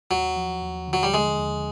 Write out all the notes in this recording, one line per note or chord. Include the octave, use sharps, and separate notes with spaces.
D#2 F#3
F3
D#2
D3
F#3
G3
D3 G#3
D#2